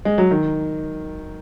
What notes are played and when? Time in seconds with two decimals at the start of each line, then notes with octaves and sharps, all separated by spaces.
0.05 G#3
0.18 F#3
0.31 D#3